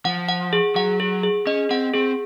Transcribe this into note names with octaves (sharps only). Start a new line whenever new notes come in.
F3 F#5
F#5
G#4
F#3 F#5
G#4
G#4
C#4 D#5
C4 F#5
C4 G#4